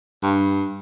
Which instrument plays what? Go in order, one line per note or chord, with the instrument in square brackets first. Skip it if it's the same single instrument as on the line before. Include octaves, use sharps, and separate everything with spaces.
[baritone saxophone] G2